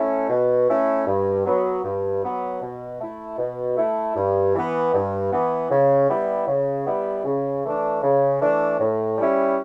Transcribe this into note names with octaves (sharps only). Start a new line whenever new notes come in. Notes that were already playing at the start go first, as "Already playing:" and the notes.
Already playing: A3 C#4 E4
B2
A3 C#4 E4
G2
F#3 B3
G2
F#3 B3
B2
A3 E4
B2
A3 E4
G2
E3 B3
G2
E3 B3
C#3
G3 B3 E4
C#3
G3 B3 E4
C#3
E3 A3 D4
C#3
E3 A3 D4
A2
G3 C#4 E4